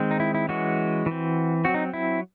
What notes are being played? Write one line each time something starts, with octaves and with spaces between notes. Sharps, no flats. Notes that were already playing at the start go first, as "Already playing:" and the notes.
Already playing: D#3 G#3 C4
D#4
E4
E4
E3 G#3 C#4 F#4
E3 C4
F#3 C4 F#4
D#4
E4